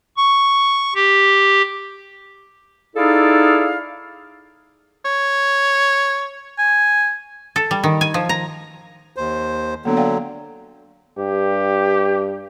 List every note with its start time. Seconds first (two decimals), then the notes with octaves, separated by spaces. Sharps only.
0.17 C#6
0.95 G4
2.95 D#4 E4 G#4 A4 D5 F5
5.05 C#5
6.58 G#5
7.56 A4
7.71 G3
7.84 D#3
8.01 G#5
8.14 F3
8.29 A#5
9.16 D#2 C5
9.85 D3 F#3 A#3 B3
9.97 D5 F5 G5
11.18 G2 G4